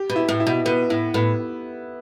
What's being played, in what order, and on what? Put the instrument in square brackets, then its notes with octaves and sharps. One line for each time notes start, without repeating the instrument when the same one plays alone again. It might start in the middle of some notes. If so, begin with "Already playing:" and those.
Already playing: [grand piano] G4
[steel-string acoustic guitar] B2
[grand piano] E4
[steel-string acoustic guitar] A2
[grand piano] E4
[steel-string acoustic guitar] B2
[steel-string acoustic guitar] B2 [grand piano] B3
[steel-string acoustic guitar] A2 [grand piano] E4
[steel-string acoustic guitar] A2 [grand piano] B3